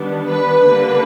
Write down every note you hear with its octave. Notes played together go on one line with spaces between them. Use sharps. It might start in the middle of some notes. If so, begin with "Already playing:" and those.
Already playing: D#3 G3 B3 D4
B4
D3 G3 A#3 D4